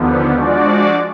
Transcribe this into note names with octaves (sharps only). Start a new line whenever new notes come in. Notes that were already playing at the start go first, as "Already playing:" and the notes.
Already playing: D#2 D3 F3 B3
F3 G#3 D4 F#4 D5